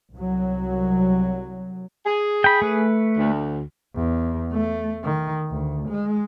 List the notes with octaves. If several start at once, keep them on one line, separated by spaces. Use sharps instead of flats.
C2 F#3
G#4
G5 B5
A3 B4
D2
E2
A3
D#3
D2
G#3